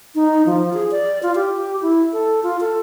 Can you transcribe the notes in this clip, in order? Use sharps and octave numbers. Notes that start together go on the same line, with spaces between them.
D#4
F3
G#4
D5
F4
G4
E4
A4
F4
A4